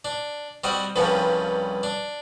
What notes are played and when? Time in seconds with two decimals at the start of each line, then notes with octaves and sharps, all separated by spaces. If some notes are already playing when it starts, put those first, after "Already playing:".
0.05 D4
0.64 G3 C4 F#4 D#5
0.96 C2 G2 C#3 F3 B3
1.83 D4